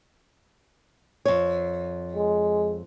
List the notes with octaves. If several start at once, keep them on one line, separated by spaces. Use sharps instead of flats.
F2 C#5
G#3